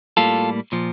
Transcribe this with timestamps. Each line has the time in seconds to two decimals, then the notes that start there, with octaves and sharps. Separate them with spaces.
0.17 A2 G3 A#3 F4 A4
0.72 A#2 F3